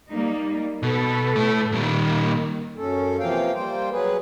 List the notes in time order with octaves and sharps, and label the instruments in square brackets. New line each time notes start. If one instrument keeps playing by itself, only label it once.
[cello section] G3 A#3 D#4
[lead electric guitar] B2 [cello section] A4 B4
[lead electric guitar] A2 A3
[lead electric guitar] A#2 G3 [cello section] D#3 A#3
[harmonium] F#2 C#4 A4
C3 E3 F3 A#3 F5 G5
G3 A#3 C5 G5
F#3 G#4 B4